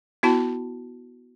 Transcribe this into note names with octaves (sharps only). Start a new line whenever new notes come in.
B3 E4 F#4 A5